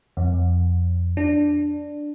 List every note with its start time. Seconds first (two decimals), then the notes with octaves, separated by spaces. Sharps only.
0.17 F2
1.17 D4